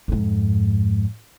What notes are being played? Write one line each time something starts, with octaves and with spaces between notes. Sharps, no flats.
F2 G#2